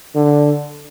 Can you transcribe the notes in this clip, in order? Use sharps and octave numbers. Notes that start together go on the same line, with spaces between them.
D3